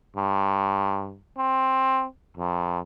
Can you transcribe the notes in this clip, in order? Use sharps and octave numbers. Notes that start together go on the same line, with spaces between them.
G2
C4
F2